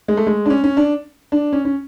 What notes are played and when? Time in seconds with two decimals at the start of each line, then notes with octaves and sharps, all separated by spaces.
0.08 G#3
0.17 A3
0.27 G#3
0.46 D4
0.50 C#4
0.64 C#4
0.77 D4
1.32 D4
1.53 C#4
1.65 C#4